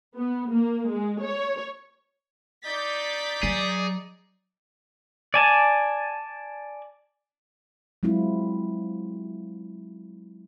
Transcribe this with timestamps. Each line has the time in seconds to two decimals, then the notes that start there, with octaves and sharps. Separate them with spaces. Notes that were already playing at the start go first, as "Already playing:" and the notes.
0.16 B3
0.52 A#3
0.91 G#3
1.24 C#5
2.65 D#4 D5 G6 A6 B6
3.43 F#3 G#4
5.34 D5 G#5 A5
8.03 F#3 G#3 C4 E4 F4